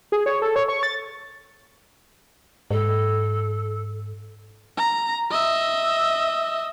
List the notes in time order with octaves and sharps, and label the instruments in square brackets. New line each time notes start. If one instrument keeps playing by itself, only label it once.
[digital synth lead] G#4
C#5
A4
C#5
C#6
A6
[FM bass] G#2 [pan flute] A4
[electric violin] A#5
D#5 E5